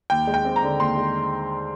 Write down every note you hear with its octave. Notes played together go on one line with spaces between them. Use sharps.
D#2 G5
G#3
G5
C4
A#5
D3
D#2 C6
G#3